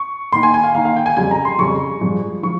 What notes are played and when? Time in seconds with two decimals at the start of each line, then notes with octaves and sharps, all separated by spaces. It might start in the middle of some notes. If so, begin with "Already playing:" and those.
Already playing: C#6
0.32 D#3 A#3 D#4 C6
0.43 G#5
0.54 G#5
0.64 F5
0.74 D#3 A#3 D#4 F5
0.85 F5
0.96 G5
1.06 G#5
1.17 F2 C#3 G3 G#5
1.31 A#5
1.45 C6
1.58 F2 C#3 G3 C#6
2.01 G2 F3 G#3
2.43 F3 C#6